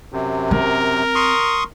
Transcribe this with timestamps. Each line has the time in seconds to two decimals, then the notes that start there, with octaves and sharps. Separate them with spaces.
0.12 F#2 C3
0.51 C4 A#4
1.15 C6 C#6 D#6